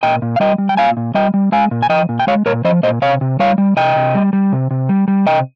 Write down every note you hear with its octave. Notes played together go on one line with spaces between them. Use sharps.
A#2 D#5 G5
A#2
F5
G3 D#5 G5
G3
G5
A#2 F5 G#5
A#2
G3 D#5 G5
G3
G#3 F5 G#5
A#2
G#5
F3 D#5 G5
A#2
G5
G#3 C#5 F5
A#2 A#4 C#5
F3 C5 D#5
A#2 C5 D#5
C3 C#5 F5
C3
G3 C#5 F5
G3
C3 D#5 G5
C3
G3
G3
C3
C3
G3
G3
C3 D#5 G5